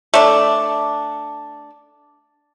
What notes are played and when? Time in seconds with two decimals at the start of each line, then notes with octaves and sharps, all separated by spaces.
0.14 A3 D4